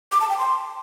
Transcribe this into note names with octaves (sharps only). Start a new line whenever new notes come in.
D6
A5
G5
C6